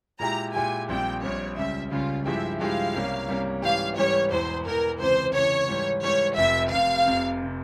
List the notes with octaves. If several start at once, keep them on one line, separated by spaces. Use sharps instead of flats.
A#2 G#3 E4 G4 A#5
A#2 G#3 E4 G4 G#5
A#1 A#2 G3 C4 G5
A#1 A#2 G3 C4 C#5
C#2 C#3 G3 E5
C#2 C#3 G3 F4
G2 F3 G#3 E4 G4 E5
G2 F3 G#3 E4 G4 F5
C2 C3 G3 A#3 C#4
C2 C3 G3 A#3 C#4
G#2 E3 G3 C#4 G4 F5
G#2 E3 G3 C#4 G4 C#5
E1 E2 E3 C5
E1 E2 E3 A#4
C#2 C3 E3 C5
C#2 C3 E3 C#5
G#2 E3 G3
G#2 E3 G3 C#5
F1 F2 C3 E5
F1 F2 C3 F5
F1 F2 C3
C3